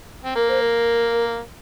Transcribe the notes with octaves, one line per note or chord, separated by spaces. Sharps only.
C4
A#3 A#4
C5
A#4